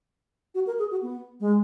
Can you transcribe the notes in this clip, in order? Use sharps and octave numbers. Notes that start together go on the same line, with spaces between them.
F#4
A#4
G#4
F#4
B3
G#3